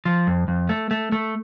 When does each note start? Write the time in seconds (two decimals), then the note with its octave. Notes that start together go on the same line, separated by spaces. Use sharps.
0.05 F3
0.27 F2
0.48 F2
0.69 A3
0.91 A3
1.12 A3